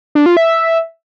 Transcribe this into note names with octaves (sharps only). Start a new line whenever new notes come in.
D4
F4
E5